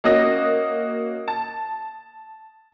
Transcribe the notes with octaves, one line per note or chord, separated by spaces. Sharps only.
A#3 C#4 F#4 D#5 D#6 A#6
A5